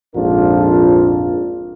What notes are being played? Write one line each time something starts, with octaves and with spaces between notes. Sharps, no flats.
A#1 F2 G#2 D4 F4 A#4